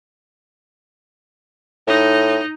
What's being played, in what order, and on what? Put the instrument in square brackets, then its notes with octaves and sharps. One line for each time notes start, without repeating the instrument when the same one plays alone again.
[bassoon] A2 [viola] D#4